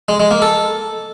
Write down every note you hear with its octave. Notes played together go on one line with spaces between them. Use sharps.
G#3
G#3
A#3
A4